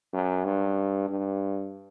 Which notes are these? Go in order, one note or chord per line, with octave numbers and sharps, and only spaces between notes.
F#2
G2
G2